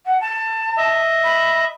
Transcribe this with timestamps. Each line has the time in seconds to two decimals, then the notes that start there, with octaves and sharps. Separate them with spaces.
0.06 F#5
0.21 A5
0.77 D#5 E5
1.24 B5